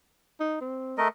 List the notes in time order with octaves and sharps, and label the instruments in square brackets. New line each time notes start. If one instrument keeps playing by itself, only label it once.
[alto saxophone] D#4
C4
[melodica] A3 A#4 D#5